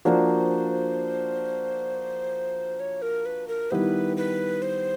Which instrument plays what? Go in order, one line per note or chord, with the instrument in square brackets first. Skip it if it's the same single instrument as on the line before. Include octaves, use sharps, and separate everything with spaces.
[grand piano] F3 A#3 D4 F#4 [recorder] C5 C#5
[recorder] C#5
A#4
B4
A#4
[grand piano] D#3 G3 B3 E4 G4 [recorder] B4 C5
[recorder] B4
C5